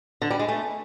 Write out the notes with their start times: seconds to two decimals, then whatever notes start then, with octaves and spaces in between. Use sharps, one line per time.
0.22 D3
0.31 G3
0.39 G#3
0.48 A3